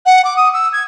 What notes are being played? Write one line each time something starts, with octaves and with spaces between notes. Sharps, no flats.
F#5
D6
D#6
E6
G#6